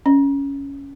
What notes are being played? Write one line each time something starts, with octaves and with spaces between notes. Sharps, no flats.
C#4